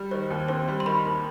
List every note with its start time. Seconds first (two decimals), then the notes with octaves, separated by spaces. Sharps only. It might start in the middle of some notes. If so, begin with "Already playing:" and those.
Already playing: G3
0.11 D#3 C5
0.30 D#2
0.48 C4 C5
0.68 G3
0.80 C6
0.86 D#3 B5
1.05 D#2